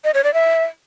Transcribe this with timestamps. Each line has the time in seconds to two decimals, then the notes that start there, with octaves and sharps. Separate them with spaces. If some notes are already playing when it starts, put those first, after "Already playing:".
0.04 D#5
0.14 C#5
0.24 D5
0.34 E5